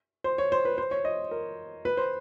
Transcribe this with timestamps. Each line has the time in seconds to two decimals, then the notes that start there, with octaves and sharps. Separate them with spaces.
0.24 C5
0.38 C#5
0.52 C5
0.65 B4
0.78 C5
0.91 C#5
1.05 D#5
1.31 A#4
1.85 B4
1.97 C5